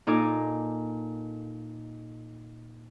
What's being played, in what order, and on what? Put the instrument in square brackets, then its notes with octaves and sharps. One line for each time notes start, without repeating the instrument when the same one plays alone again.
[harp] A#2 D#4 A4 A#4 G#5 D6